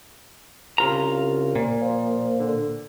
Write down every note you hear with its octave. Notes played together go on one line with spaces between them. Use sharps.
C2 C#3 F4 A#5
A#2
F3
D3